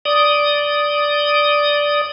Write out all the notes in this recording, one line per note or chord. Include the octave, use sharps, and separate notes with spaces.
D5 D#6